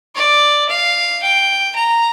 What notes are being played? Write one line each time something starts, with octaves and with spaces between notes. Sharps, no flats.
D5
F5
G5
A#5